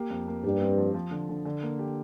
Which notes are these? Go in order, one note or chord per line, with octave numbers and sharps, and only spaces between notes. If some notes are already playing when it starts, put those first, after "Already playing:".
Already playing: A#3 G4
F2
A#3
G2 G4
C4
F3
F3
D3
D3
D3
A#3
G4